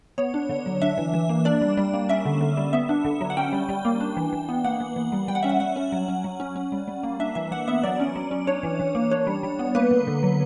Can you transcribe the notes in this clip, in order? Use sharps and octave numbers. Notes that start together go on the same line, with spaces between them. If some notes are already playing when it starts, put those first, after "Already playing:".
B3 C#5
D4
D3
F#3
D4 E5
E3
E3
A#3
D4 D5
G3
G3
A#3
C#4 E5
D3
D3
G3
B3 E5
D4
D3
F#3
F#5
C#4 G5
G3
G3
A#3
D4
E3
E3
B3
A#3 F#5
E3
E3
G3
G3 G5
F#5
C#4 E5
F#5
G3 F#5
C#4
F#3
C#4
F#3
C#4
C#4
G3
G3
A#3
D4 E5
E3 E5
E3 F#5
B3 E5
F#3 D5
C#4
F#3
C#4
D4 C#5
E3
E3
A#3
D4 C#5
G3
G3
B3
A#3 B4
D3
D3
F#3